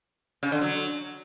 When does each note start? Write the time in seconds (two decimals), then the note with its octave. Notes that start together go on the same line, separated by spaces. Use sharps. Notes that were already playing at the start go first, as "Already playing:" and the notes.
0.43 C#3
0.52 D3
0.61 F#3